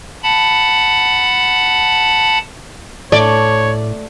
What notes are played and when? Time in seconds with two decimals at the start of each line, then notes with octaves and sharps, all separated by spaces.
0.23 F#5 A5 B5
3.12 A2 A3 C#5 D5